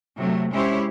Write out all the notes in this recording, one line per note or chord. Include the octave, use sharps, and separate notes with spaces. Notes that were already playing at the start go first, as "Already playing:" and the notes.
C3 F#3 A3
G#3 C#4 E4 G4 C5 C#5